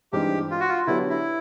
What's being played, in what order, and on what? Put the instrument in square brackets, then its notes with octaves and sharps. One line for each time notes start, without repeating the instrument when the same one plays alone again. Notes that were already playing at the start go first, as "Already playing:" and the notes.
[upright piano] G2 E3 G#3 C4 D#4 [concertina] G4
[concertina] F4
F#4
F4
[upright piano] D3 F#3 B3 D4 G4 [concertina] E4
[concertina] E4